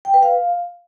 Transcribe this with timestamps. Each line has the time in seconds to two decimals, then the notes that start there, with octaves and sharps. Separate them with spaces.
0.05 G5
0.14 B4
0.23 F5